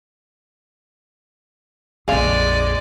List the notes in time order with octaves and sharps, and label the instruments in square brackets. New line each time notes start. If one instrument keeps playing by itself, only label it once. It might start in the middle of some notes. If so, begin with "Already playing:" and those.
[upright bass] A#1 F2 [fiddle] G#3 D5 [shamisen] G#4 F5